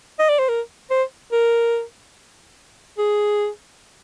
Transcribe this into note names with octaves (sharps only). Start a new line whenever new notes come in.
D#5
D5
C5
A#4
C5
A#4
G#4